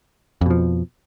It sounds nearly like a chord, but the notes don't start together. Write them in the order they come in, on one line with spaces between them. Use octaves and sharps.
F2 B2 F3